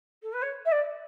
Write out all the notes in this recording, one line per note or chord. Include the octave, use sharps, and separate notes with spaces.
A4
B4
C#5
E5
D5